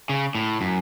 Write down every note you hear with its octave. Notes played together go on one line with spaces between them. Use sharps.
C#3
A2
F#2